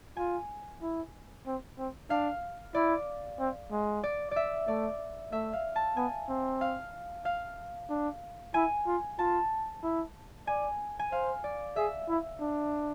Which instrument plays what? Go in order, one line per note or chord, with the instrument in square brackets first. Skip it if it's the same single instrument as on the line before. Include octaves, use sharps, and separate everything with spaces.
[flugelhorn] F4 [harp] G#5
[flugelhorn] E4
C4
C4
[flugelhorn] D4 [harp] F5
[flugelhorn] E4 [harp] D5
[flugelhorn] C4
G#3
[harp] D5
D5 E5
[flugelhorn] A3 [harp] D5
[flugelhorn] A3 [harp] E5
[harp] F5
A5
[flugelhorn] B3 [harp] G#5
[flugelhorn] C4
[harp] F5
F5
[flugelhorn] D4
[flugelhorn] E4 [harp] G#5
[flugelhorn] F4
[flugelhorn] F4 [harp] A5
[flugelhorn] E4
[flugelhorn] D5 [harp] G#5
[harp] G#5
[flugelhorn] C5 [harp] F5
[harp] D5
[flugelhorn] G#4 [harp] E5
[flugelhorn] E4
D4